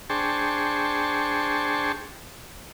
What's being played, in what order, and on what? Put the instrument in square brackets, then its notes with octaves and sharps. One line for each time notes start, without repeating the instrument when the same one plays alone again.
[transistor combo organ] D4 G#4 C5 G5 A5 C#6